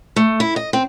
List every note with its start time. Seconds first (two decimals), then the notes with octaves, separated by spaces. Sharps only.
0.16 A3
0.40 E4
0.56 D#5
0.73 C4